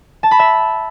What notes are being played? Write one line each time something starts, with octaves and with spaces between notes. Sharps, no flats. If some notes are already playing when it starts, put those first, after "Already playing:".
A5
B5
E5